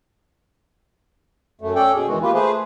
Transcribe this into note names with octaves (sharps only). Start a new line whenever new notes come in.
F#2 A3
C#4 A4 D5 G5
B2 G#4
E2 D#3 E3 G#3 F#4
A#3 F4 G4 B4
A3 G#4 B4 C5